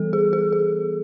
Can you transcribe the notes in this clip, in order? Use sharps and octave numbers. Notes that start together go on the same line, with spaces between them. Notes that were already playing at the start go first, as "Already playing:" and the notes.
Already playing: E3 G3 B3 A4
G#4
G#4
G#4